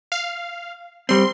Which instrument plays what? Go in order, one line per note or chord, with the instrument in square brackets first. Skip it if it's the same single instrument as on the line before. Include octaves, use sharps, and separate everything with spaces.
[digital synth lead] F5
[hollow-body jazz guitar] G3 C4 [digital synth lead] C6